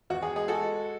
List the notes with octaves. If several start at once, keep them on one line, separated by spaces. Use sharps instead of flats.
E2 F#4
G#4
G#3 G#4
F#4 A4
G#3